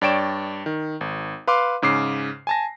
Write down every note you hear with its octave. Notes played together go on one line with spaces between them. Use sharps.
G2 C#5 D5 G5 D7 E7
D#3
G#1
B4 F5 C6 D6
G#2 C#3 D6 C7
G#5 A5 A#6